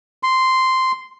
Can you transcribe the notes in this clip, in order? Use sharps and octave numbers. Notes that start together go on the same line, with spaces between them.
C6